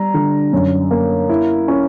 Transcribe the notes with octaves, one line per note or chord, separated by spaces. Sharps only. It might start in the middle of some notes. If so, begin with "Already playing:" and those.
Already playing: G3 A#5
D3
F#2
A#3
E4
C#4